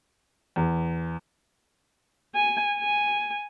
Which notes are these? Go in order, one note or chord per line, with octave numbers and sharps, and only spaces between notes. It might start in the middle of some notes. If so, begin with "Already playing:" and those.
E2
G#5
G#5